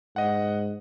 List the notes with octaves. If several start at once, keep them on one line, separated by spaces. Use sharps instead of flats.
G#2 D#5 F#5